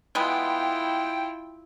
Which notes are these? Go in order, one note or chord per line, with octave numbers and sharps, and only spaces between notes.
B2 G#3 B3 E4 F4 G5